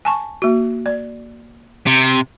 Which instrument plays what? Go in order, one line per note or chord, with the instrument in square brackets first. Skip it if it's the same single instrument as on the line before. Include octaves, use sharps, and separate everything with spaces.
[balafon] G#5 A5 C#6
A#3 F#4
D5
[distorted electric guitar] C3